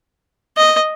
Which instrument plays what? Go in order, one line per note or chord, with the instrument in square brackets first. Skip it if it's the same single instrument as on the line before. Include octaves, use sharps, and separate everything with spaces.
[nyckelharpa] D#5